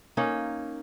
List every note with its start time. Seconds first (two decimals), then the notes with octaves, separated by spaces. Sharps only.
0.17 A#3 C#4 D#4